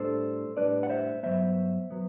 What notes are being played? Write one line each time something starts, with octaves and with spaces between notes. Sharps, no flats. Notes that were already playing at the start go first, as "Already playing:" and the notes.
Already playing: A2 G3 D4 A4 C5
A2 G3 D4 B4 D5
F#5
C5 E5
G2 F#3 B3 C5 E5
F#3 B3